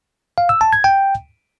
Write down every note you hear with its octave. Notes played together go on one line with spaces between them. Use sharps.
F5
E6
A5
G#6
G5